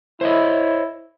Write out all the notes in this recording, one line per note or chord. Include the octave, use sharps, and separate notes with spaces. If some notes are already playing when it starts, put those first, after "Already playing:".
E4 C5 C#5 D#5